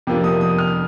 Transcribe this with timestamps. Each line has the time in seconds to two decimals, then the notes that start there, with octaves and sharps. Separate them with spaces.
0.07 F2 C3 F3 A#3 D4
0.24 D#6
0.41 D#6
0.58 F6